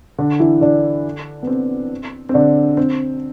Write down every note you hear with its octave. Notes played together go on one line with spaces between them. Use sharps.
D3 D4
E3 E4
D3 D4
B3
C4
C4
D3 D4
C4